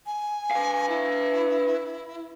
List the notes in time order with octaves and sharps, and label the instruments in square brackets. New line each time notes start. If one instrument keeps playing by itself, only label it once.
[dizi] G#5
[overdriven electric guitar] B4 F5
[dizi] E4